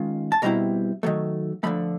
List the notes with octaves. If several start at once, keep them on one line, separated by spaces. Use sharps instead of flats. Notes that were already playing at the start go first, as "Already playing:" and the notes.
Already playing: D#3 G#3 C#4 F4
A5
B2 G3 C4 E4 A#5
D#3 F#3 A3
D3 F3 A3 B5